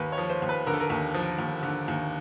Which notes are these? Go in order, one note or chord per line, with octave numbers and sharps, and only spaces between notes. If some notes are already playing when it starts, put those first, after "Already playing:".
Already playing: D#2 B4
C#5
F3
C5
D#2
B4
D3 A#4
A4
A#4
D#2
F3
D#2
D3
D#2